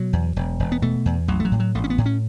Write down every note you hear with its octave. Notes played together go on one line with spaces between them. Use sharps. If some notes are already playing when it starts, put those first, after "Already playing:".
Already playing: B2 F#3
E2
E1
E1
B3
B2 A3
E2
A1 F#3
A3
F#3
A2
F#3
A1 A3
C#4
B3
A2
C#4